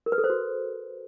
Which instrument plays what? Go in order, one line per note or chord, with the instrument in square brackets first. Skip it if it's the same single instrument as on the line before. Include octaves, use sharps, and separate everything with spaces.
[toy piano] A#4
B4
A4
C5
F#4